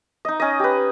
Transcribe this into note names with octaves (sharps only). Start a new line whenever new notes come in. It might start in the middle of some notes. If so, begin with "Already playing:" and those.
D#4 D#5
C#4 D#5
G4 B4